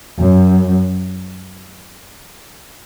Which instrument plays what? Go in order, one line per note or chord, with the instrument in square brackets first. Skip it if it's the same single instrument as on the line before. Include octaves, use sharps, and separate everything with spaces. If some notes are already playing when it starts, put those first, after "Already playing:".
[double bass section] F#2